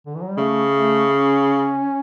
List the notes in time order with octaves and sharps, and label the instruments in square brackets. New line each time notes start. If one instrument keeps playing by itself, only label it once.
[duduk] D3
E3
F#3
G3
[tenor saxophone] C#3 [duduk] A3
[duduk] A3
C#4